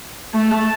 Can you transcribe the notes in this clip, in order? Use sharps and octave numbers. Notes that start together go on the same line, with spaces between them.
A3 A5